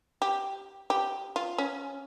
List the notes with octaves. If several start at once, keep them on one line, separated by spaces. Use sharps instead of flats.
G4
G4
F4
C#4